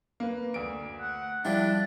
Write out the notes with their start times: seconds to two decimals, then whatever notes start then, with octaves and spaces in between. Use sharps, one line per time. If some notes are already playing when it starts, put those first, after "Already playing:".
0.20 A#3 B4
0.54 D2 D7
1.00 F#5
1.45 F3 G3 D4 E4 G5